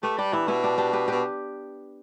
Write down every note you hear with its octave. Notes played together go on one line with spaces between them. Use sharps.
A3 G4 B4
G3 D4 G4
E3 B3 E4
B2 B3 E4
D4 G4
D4 G4
G4 B4
B2 G4 B4